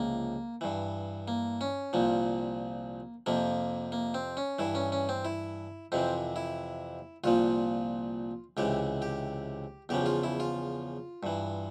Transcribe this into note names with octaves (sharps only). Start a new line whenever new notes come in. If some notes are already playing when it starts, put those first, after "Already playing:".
Already playing: C#2 C3 F3 A#3
G2 E3
A#3
C#4
C2 A#2 F3 A#3
F2 C3 F3 A#3
A#3
C4
C#4
G2 E3 E4
C#4
C#4
C4
E4
F2 C3 E3 C4
E4
C2 A#2 F3 F4
C#2 C3 E3 G4
G4
E2 C#3 F3 G4
F4
E4
F4
G2 E3